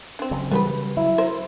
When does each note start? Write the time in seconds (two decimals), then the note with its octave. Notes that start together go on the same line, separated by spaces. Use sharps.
0.19 C4 D4
0.31 C#3 F#3
0.51 E3 G3 B3 G4 G#4 B4
0.97 F#3 E4
1.18 A#4 C5